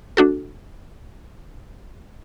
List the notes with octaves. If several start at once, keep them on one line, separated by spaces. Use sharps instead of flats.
A3 D4 F#4 A4